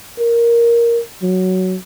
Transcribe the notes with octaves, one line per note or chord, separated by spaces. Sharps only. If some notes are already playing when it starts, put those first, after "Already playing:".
A#4
F#3